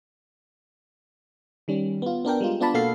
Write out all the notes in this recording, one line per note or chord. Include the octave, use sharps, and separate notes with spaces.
D#3 G3 C#4
B3 F4
B3 D4 A#4 G5
G3 G#3 F4
B3 D4 F4 D5 A5 B5
B2 A#3 F#4 A4 F5 C7